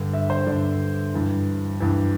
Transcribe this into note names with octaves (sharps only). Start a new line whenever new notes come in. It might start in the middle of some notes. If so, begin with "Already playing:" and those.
Already playing: G2 D3
E5
C5
G2 D3 D5
G2 E3
G2 E3